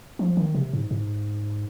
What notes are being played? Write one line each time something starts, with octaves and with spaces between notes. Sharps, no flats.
F3
D#3
C3
G#2
G#2